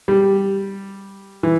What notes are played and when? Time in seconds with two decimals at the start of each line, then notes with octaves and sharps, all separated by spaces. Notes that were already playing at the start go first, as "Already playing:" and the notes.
0.08 G3
1.43 E3